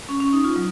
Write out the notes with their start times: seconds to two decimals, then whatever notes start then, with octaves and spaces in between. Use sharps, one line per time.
0.09 C#4
0.20 C#4
0.33 D#4
0.44 F4
0.56 F#3